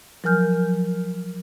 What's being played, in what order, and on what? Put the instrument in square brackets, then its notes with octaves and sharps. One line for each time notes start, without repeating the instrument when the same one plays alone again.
[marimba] F3 F#3 A#4 G#5 F6 G6